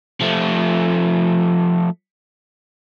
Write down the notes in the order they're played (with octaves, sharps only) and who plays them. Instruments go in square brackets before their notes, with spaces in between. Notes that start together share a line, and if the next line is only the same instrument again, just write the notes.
[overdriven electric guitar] F3 A3